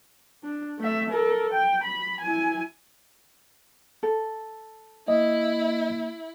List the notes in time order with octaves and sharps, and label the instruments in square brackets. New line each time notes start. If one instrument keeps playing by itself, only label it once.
[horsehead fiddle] D4
A3 E5
A4 A#4
G5
B5
E4 G#5
[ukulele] A4
[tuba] A#3 [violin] E4 [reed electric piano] D#5